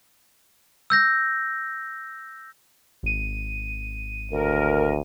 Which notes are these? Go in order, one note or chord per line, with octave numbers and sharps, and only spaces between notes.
E6 G6 A#6
G#1 D#7
D2 A#4